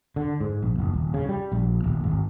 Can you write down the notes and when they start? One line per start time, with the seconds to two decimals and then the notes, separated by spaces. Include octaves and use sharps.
0.16 D3
0.40 G#2
0.63 A#1
0.78 F#1
0.94 D#1
1.14 C#3
1.29 G3
1.52 A#1
1.84 D#1
2.04 G#1